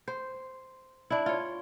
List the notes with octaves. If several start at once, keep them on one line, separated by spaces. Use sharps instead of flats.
C5
D4 E4
F4 C#5